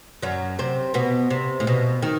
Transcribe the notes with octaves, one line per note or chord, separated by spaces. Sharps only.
F#2 F#3
C3 C4
B2 B3
C3
A2
B2
D#3